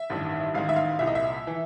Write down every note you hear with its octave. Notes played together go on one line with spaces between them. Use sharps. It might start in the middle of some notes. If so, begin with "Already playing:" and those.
Already playing: E5
A1 G2 D#3
A1 G#2 D#3 F5
E5
F5
C2 A#2 E5
D#5
E5
E3